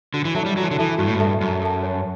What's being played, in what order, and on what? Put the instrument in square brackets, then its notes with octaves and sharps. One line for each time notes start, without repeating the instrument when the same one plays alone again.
[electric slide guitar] D3 [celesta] F#4
[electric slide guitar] E3
[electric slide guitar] F#3 [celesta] A4 E5 A5
[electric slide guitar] G3
[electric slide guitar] F#3 [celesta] F#4
[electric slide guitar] E3
D3
[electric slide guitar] E3 [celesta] A4 E5 A5
[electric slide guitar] G2 [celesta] F#4
[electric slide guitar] A2
G2
[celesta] A4 E5 A5
[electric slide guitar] F#2 [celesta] F#4
[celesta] A4 E5 A5
C#5